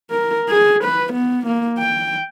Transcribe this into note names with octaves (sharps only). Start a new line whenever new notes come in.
A#4
G#4
B4
B3
A#3
G5